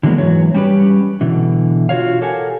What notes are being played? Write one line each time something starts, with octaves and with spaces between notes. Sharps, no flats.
D3 E3 F#3 G#3 A#3 B3
G#2 E3 F#3 C#5
G3 C#4 G4 B4
B2 D3 E3
F4 F#4 A#4 C#5 F5
G4 A4 A#4 F#5 G#5